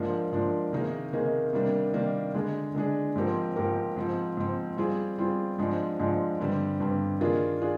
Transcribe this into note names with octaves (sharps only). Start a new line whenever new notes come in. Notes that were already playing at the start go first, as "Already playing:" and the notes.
Already playing: G#2 F3 A#3 D4
G#2 F3 A#3 D4
C3 D#3 A#3 D#4 G#4
C3 D#3 A#3 D#4 G#4
C3 D#3 G3 A#3 D4
C3 D#3 G3 A#3 D4
D3 G#3 D4 G#4
D3 G#3 D4 G#4
G#2 F3 C4 G4 A#4
G#2 F3 C4 G4 A#4
G#2 F3 C4
G#2 F3 C4
G3 C4 F4 G#4
G3 C4 F4 G#4
G#2 F3 G#3 D4
G#2 F3 G#3 D4
G2 D3 G3 C4
G2 D3 G3 C4
D#3 A#3 D4 F4 G#4
D4 F4 G#4